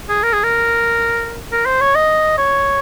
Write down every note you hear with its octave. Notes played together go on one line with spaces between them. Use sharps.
G#4
A#4
G#4
A#4
A#4
C5
C#5
D#5
C#5